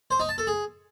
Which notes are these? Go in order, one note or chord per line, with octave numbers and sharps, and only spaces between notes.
C5
D#4
A5
A4
G#4